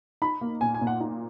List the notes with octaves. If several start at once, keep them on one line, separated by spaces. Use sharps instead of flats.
D#4 B5
A#3
A#2 G#5
G#5
A#2
F#5
D#4